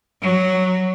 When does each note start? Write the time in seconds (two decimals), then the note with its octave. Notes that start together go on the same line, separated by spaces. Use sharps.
0.22 F#3